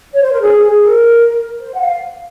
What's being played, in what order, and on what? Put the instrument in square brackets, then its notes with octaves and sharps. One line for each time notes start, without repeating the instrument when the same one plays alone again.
[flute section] C#5
C5
A#4
G#4
G#4
A#4
C5
F#5
F5